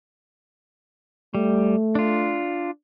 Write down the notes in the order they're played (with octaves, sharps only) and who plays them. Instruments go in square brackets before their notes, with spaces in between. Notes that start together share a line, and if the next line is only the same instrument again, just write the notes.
[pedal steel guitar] G3 [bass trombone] A3
[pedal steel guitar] D4 F4